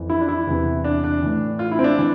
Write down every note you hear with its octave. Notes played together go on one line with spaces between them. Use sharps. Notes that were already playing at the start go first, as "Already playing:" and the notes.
Already playing: F2 E3
E4
D4
E4
E2 C3 E3
D4
D4
A2 E3
F4
E4
C4
D4
E3